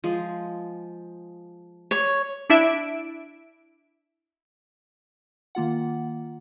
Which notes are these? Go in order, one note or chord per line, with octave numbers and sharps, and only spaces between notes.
F3 G#3
C#5
D4 E4 E5 D7
D#3 A#3 F4 F#5